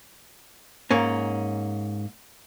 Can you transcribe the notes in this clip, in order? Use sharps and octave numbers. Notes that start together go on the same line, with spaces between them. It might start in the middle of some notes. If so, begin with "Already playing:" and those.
G#2 A#3 C#4